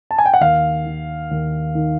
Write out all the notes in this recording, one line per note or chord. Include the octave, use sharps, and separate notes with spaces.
A5
G#5
G5
F#5
D#2 F5
D#3
D#2
D#3